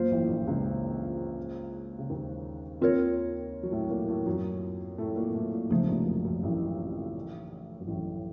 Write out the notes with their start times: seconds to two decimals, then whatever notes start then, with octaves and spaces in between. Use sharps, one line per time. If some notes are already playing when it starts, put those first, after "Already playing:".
Already playing: F#2 A#3 F4 C5
0.11 A1 A2
0.29 A#1 A#2
0.47 C#2 C#3
1.99 C#3
2.10 D#2 D#3
2.81 D#2 D#3 C4 F4 A#4 C#5
3.63 F#3
3.72 A2 A3
3.90 A#2 A#3
4.08 A2 A3
4.26 F#2 F#3
4.98 A2 A3
5.16 A#2 A#3
5.35 A2 A3
5.53 A#2 A#3
5.70 C#2 C#3 F3 A3 D#4
5.81 C3
5.89 A#1 A#2
6.07 F#2
6.25 F#2
6.43 A1 A2
7.80 F#2
7.87 A1 A2